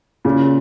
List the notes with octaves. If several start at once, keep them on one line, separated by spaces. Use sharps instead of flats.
A#2 C#3